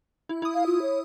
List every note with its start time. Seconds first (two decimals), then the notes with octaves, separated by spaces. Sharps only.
0.29 E4
0.42 E4 D#6
0.54 F5
0.66 F4
0.82 C#5